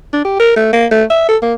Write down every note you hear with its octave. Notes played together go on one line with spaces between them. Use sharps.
D4
G4
A#4
A3
A#3
A3
E5
A4
A#3